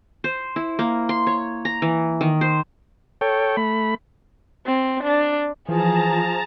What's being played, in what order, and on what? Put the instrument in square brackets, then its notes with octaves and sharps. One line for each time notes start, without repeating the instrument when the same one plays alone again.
[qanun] C5
E4
A#3
C6
C#5
A#5
E3
D#3
C5
[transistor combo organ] A4 C#5 G5
A3 B5
[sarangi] C4
D4
[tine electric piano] E3 [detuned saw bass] F3 [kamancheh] G#4 [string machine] A5 A#5